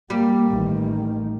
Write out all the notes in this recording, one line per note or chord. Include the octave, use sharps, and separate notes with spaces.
G3 A#3
A1 D#3